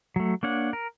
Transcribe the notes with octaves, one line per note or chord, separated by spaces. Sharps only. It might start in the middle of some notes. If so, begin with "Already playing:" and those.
F#3 A3
A#3 D4 C#5 F#5
A#4